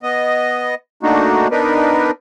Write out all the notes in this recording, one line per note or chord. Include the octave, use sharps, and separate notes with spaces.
B3 D#5
A3 A#3 D4 D#4 F#4
B3 D4 D#4 A#4 B4